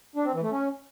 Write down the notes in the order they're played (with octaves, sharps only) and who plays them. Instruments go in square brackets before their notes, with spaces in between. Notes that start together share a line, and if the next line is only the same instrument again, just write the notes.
[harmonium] D4
C4
E3
A3
C#4